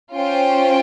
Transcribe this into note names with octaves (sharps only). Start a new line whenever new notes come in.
C#4 F4 C5 G5